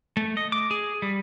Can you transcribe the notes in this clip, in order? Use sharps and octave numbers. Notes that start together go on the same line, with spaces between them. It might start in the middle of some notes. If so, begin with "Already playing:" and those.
A3
D#5
D6
G#4
G3